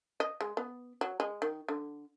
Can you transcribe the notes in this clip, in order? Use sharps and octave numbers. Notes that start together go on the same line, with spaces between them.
D#5
G#3
B3
F#3
G#3
D#3
D3